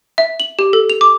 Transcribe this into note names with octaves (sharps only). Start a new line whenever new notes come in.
E5
F#7
G4
A4
F7
D6